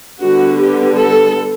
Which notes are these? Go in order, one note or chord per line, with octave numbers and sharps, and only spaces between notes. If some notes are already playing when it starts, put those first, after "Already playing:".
D3 G3 B3 F#4
G4
A4